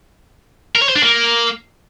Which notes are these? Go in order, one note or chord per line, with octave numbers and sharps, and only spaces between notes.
A#4
C#5
C5
D4
A#3